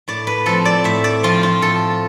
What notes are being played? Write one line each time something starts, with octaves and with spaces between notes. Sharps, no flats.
A2 D5
B4
F3 C4 A4
D5
A2 E5
D5
F3 C4 F4
F4
A2 A4